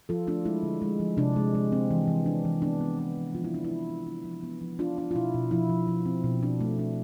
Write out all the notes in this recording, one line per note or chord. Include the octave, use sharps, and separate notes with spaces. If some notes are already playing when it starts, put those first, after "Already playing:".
F3 F4 A4
A3 D4 F4
G#3 E4
D3
G#3
F3
C3 D4
G#3
G#3
C4
E3
E3
D4
E3
B3 D4
B3
D4
F3
F3 F4
E4
F3 D4
E4
F3
D4
D4
F3
B3
F3
D4 F4
D4
F4
B2 E4
B2
F3 E4
F3
F3
C4
B2
D4
A3
D4